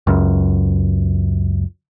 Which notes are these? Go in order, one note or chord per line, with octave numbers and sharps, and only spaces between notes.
C#2 F#2